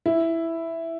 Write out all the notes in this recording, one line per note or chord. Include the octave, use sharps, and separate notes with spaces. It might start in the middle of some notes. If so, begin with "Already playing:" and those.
E4